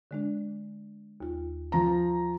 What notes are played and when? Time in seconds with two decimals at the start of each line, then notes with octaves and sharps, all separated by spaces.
0.11 D3 G#3 D4
1.20 D#2 F4
1.72 F3 A#5